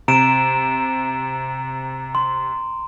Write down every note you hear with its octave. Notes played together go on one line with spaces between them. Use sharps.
C3 A#5 D7 E7
C6